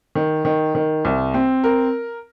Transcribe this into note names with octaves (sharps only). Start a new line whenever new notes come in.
D#3
D#3
D#3
C2
C4
A#4